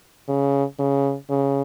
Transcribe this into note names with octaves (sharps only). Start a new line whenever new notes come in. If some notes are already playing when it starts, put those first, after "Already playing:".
C#3
C#3
C#3